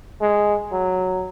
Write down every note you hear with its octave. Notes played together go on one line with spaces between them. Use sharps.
G#3
F#3